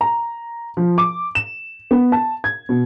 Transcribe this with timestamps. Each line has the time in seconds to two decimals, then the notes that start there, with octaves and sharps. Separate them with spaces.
0.01 A#5
0.77 F3
0.98 D6
1.35 E7
1.91 B3
2.12 A5
2.44 G#6
2.69 B2